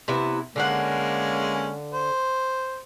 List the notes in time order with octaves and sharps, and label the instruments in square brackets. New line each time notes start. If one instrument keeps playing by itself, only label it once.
[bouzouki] C3 B3 E4
[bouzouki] D3 F5 F#5 [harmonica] G#3 A#3 C#4
[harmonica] C5